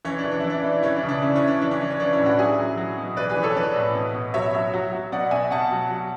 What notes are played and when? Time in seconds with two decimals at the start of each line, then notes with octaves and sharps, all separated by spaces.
0.05 E3 C#4
0.18 D4
0.24 E3
0.31 D4
0.40 E3 E4
0.50 D4
0.64 E3
0.82 E3 C#4 E4
0.96 D4
1.03 C#3
1.09 D4
1.22 C#3 C#4 E4
1.36 C#4
1.41 C#3
1.48 D4
1.61 E3 D4
1.71 C#4
1.80 E3 D4
1.90 C#4
2.00 E3 D4
2.12 C#4 E4
2.19 A2
2.26 D4 F#4
2.39 F#3 E4 G#4
2.59 F#3
2.77 F#3
2.98 B2
3.17 E3 B4 D5
3.30 G#4 B4
3.37 E3
3.43 A4 C#5
3.56 E3 B4 D5
3.76 A2
3.95 B2
4.14 B2
4.34 F#3 C#5 E5
4.54 F#3
4.74 F#3
4.93 F#3
5.12 B2 D5 F#5
5.31 B2 E5 G#5
5.51 B2 F#5 A5
5.71 F#3
5.90 F#3